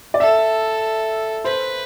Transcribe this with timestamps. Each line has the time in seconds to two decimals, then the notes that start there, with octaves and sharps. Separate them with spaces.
0.14 D5
0.20 A4 E5
1.44 B4 C5